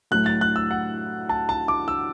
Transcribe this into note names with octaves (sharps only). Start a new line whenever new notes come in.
A2 F#3 A3 F#6
A6
F#6
E6
F#5
A5
A5
D6
E6